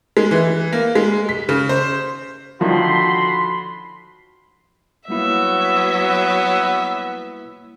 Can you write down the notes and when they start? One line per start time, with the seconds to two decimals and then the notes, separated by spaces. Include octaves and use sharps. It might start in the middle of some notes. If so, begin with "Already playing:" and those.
0.17 G#3
0.31 E3
0.73 A#3
0.95 G#3
1.29 B6
1.49 C#3
1.69 C5
2.61 D3 D#3 F3 F#4 B5 C6
5.08 F#3 G3 A#3 B3 E4 E5